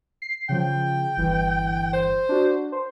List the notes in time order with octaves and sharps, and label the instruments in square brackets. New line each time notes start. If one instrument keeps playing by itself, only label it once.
[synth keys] C7
[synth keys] C#3 F3 [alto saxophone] G5
[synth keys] G1 E3
[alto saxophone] C5
[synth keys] D4 F#4
C5